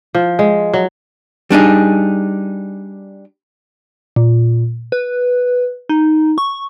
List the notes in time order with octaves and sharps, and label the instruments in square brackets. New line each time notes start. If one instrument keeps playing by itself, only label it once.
[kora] F3
G#3
F#3
[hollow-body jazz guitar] G3 D4 D#4 G#4
[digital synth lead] A#2
B4
D#4
C#6